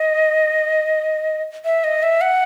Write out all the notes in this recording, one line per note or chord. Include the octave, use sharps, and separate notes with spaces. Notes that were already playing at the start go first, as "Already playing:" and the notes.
Already playing: D#5
E5
D#5
E5
F#5